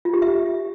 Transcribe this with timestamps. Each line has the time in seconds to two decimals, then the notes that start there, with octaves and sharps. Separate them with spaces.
0.05 F4
0.14 G4
0.22 E5